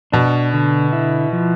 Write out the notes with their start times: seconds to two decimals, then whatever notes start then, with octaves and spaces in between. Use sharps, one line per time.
0.12 B2 D4
0.53 D3
0.93 E4
1.33 F3